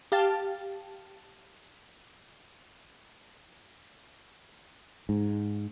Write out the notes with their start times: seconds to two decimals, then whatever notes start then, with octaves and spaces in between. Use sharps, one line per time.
0.12 G4 F5 A5
5.09 G#2